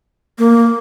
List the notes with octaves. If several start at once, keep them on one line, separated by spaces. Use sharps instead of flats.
A#3